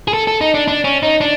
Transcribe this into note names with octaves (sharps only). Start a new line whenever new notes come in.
G#4
A4
A4
D#4
D4
D4
C#4
D#4
D4